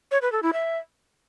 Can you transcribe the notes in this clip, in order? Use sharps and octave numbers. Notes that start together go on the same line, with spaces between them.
C#5
B4
A4
E4
E5